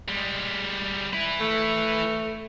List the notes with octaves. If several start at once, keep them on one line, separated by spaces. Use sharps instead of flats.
G3 G#3
E4 B4
A3